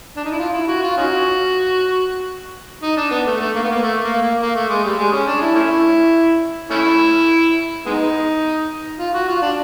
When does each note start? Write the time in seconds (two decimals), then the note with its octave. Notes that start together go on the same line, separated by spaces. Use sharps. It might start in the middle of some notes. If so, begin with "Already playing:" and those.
0.16 D4
0.24 D#4
0.32 E4
0.39 F4
0.53 E4
0.68 F#4
0.82 F4
0.97 C#4 D#4 F#4
2.83 D#4
2.97 D4
3.11 B3
3.27 A3
3.40 A3
3.55 A#3
3.63 B3
3.70 A#3
3.83 A3
4.03 A#3
4.21 A#3
4.41 A#3
4.55 A3
4.69 G#3
4.84 G3
4.98 G#3
5.13 C#4
5.27 D4
5.42 E4
5.55 A3 C#4 E4
6.71 A3 C#4 E4
7.86 G#3 B3 D#4
8.99 F4
9.14 F#4
9.28 F4
9.42 D4